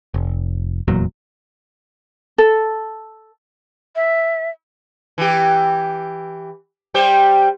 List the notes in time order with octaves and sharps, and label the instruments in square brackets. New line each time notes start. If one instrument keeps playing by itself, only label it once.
[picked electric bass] F1
F1 E2 A#2 F#3
[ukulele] A4
[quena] E5
[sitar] E3 G4
G3 G4 C5